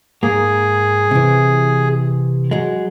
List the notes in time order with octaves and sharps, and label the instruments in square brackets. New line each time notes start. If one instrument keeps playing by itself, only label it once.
[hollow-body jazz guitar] G#2 A#3 [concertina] G#4
[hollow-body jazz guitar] C3 E3
F#3 G#3